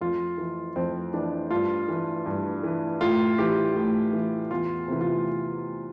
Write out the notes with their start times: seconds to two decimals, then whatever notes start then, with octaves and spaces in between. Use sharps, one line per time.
0.01 F2 F4
0.38 E3
0.76 F2 C4
1.13 E3 D4
1.51 G2 F4
1.88 E3
2.26 G2
2.63 E3
3.01 A2 F4
3.38 E3 G4
3.76 A2
4.13 E3
4.51 E2 F4
4.88 C3 E3
5.01 F4